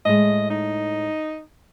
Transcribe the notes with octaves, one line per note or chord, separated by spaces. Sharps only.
A2 G#3 D#5
D#4